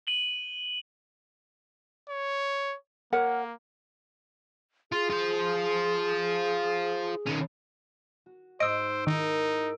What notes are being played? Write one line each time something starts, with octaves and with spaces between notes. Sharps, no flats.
D#7 F#7 G7
C#5
A#3 A#4 C#5 F#5
F4 G#4
F4 C5
D#3 C#4
F#4
G#2 D#4 C5 D#5 E6 D7
D#3 D#4 E4 G#4 A#4